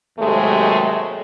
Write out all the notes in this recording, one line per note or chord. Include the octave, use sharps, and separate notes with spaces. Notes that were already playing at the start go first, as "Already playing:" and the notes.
D#2 C3 F#3 G#3 A3